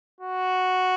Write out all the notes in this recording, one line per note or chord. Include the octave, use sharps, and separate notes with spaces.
F#4